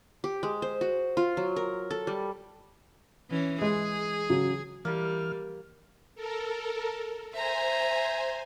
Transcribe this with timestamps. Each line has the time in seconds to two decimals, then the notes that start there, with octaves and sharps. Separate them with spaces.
0.24 G4
0.43 G#3
0.62 C5
0.81 F#4
1.17 F4
1.37 F#3
1.56 A#4
1.91 A4
2.07 G3
3.30 E3 C#4
3.62 G#3 G#4
4.30 C#3 F#3
4.85 E3 G3 A#3 F6
6.15 A4 A#4
7.33 C5 E5 G#5 A#5